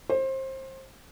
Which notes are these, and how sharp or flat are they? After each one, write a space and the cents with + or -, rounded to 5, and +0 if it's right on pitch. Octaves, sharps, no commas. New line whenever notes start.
C5 +25